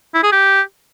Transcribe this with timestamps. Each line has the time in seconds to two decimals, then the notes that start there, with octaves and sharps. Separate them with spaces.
0.14 E4
0.23 G#4
0.32 G4